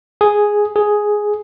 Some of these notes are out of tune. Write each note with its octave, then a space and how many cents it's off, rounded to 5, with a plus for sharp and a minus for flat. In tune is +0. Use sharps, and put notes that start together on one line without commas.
G#4 +0
G#4 +5